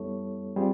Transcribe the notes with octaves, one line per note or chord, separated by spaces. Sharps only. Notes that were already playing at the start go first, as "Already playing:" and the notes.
Already playing: G3 B3 E4 A4 C#5
G3 C4 F4 G#4